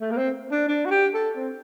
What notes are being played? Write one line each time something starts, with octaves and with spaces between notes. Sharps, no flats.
A3
A#3
C4
D4
D4
F#4
G4
A4
C4